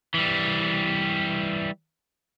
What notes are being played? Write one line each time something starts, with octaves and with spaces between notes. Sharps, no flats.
E3 G3